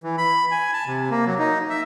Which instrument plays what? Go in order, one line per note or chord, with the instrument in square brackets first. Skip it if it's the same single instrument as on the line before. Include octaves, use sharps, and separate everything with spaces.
[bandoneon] E3
B5
G#5
A5
C3
A#3
F#3
D#4
E5